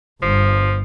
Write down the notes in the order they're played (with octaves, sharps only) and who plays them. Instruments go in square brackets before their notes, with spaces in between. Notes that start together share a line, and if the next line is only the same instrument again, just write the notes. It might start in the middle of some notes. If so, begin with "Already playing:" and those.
[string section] G1 [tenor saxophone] F3